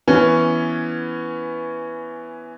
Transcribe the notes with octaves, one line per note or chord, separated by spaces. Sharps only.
E3 B3 C#4